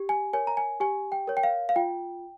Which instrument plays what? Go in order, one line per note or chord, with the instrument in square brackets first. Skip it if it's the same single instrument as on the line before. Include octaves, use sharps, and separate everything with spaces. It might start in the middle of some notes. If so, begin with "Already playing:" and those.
Already playing: [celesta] G4
G#5
A#4 C#5 G#5
A#5
G#5
G4 G#5
G5
A#4 C#5
G5
F5
F5
F4 G5